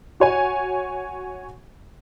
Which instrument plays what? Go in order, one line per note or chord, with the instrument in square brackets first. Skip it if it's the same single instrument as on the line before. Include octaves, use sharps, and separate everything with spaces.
[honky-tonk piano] F#4 C#5 G#5